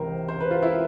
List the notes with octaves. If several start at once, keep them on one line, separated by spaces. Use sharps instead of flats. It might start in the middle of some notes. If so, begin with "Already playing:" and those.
Already playing: C#2 C3 E3 A#4 C5
C5
B4
F4
E4